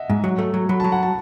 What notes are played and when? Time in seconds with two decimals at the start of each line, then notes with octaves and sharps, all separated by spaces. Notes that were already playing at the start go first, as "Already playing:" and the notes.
Already playing: D#5 E5 F#5
0.10 G#2
0.24 F#3
0.38 A3
0.54 F#3
0.69 F#3 B5
0.80 F#3 A5
0.92 F#5
1.03 A5